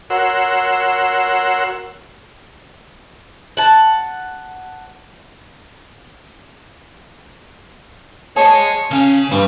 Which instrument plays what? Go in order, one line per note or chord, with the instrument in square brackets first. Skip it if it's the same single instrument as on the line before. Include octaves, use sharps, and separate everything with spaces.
[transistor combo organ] F#4 A#4 C#5 F#5 C6 E6
[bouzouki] F#5 A5
[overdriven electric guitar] G#4 D#5 [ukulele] C5 A5 [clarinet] C#5
[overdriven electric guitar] C#3 F5 [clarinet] C#4
[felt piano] G2 [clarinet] E3 [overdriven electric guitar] G3